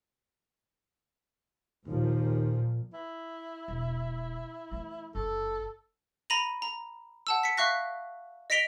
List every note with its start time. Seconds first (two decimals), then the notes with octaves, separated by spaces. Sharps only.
1.87 D#2 A#2 F3 A#3
2.94 E4
3.68 E1
4.71 E3 A3
5.15 F#1 F2 A4
6.30 A#5 B5 A#6 D#7 F7 F#7
6.62 A#5
7.27 F#5 A5 E6
7.43 B6 C#7
7.57 E5 F5 C#6 F#6 A#6
8.50 D#5 A#6 B6 D7 F7 G7